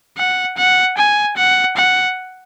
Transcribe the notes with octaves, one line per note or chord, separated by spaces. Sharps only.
F#5
F#5
G#5
F#5
F#5